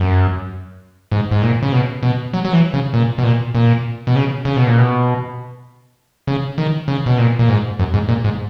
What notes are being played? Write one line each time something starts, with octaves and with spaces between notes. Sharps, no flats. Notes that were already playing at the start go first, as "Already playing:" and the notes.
Already playing: F#2
G#2
G#2
A#2
C#3
B2
B2
F#3
F#3
E3
C#3
A#2
B2
A#2
A#2
B2
C#3
C#3
B2
A#2
B2
C#3
D#3
C#3
B2
A#2
A#2
G#2
F#2
G#2
A#2
G#2